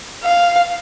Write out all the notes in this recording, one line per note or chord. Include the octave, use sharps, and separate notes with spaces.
F5